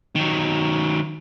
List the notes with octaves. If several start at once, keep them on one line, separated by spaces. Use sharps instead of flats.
D#3 F#3